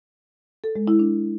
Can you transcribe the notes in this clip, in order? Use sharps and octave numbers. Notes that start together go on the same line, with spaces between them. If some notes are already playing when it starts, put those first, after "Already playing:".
A4
G#3
E4
D4